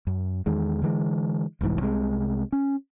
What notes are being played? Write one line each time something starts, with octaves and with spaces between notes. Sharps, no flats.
F#2
E2 D#3 G#3
D3 E3 G#3
E1 C2 G#2 E3
C2 C3 E3 G#3
C#4